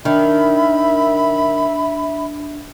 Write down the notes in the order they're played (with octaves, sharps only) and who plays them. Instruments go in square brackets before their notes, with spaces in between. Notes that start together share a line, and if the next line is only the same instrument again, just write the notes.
[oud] D#3 [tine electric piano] D4 [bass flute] E5 [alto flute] B5